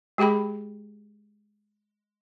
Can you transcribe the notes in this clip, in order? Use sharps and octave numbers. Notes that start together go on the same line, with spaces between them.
G#3 G4 G#4 G5 B5